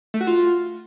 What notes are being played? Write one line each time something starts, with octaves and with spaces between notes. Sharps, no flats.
A3
F#4
F4